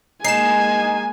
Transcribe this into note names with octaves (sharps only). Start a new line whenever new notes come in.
G#3 A#3 D#4 G#5 C7 E7